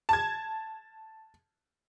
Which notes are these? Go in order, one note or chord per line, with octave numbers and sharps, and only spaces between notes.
A5 G#6